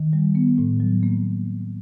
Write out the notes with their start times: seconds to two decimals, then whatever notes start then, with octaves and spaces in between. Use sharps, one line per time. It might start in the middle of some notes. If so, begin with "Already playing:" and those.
Already playing: D#3
0.13 G3
0.35 B3
0.58 A2
0.80 F#3
1.03 A#3